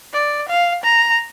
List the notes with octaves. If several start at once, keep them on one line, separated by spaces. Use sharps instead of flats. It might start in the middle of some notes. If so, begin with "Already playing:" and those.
D5
F5
A#5